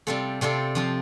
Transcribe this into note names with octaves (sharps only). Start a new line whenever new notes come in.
C3 G3 C4 F4 A4
C3 G3 C4 F4 A4
F3 C4 F4